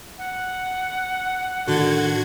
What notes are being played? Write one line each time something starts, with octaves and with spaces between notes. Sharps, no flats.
F#5
A2 D3 D#3 F#4 G#6